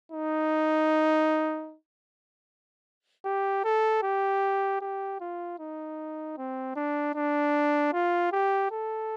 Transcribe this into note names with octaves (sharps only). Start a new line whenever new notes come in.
D#4
G4
A4
G4
G4
F4
D#4
C4
D4
D4
F4
G4
A4